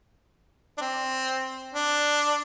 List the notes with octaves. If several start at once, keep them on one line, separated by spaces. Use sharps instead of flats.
D4
C4
D4